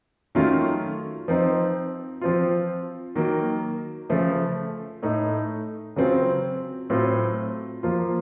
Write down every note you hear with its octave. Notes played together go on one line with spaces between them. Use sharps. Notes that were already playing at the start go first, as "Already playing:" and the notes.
D#3 F#3 A3 C#4 F4
F3 C4 D#4
F3 C4 F4
D#3 F#3 A#3
C#3 F3 A3
A2 A3 D#4
C#3 F#3 C4 F4
A2 F#3 C4 F4
F3 A#3 F4